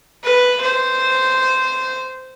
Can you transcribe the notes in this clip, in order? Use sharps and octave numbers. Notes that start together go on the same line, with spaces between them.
B4
C5